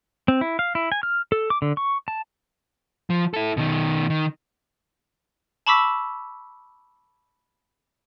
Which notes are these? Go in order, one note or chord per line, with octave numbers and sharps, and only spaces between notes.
C4
E4
F5
E4
G#5
F6
A4
D6
D3
C#6
A5
F3
E4 A4
B2 D#3
D#3
A5 B5 C#6 D6 E6 B6